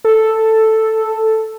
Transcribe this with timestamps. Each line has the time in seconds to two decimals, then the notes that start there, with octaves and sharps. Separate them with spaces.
0.04 A4